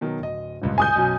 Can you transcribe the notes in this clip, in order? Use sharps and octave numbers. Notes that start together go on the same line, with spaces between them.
B2 D#3 F#3
D1 D#5
D#1 C#2 G2
G#5 D#6 G6
B1 F#2 F#3